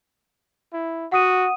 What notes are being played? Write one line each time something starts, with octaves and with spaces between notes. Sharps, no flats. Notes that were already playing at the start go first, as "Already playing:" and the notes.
E4
F#4 F#5 D#6 D#7